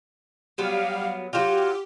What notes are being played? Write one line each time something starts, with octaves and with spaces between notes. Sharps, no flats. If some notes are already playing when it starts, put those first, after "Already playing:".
F#3 G3 B3 F5
F#3 F4 G4